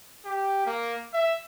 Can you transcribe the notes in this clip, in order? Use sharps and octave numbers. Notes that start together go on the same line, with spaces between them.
G4
A#3
E5